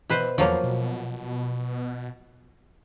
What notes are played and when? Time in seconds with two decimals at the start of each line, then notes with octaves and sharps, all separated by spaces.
0.10 B2 E3 B4 C5
0.38 E2 F3 F#3 A#3
0.64 B2